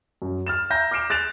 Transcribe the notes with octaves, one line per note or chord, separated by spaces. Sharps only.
F#2
F6 A6 E7
E5 A#5 G6 A#6
D6 F6 C7 D7 E7
F#6 A6 D7 E7 F7